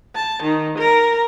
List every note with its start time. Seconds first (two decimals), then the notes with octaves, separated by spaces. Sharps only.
0.14 A5
0.42 D#3
0.77 A#4